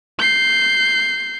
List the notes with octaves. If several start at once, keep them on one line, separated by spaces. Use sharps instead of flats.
G6 C7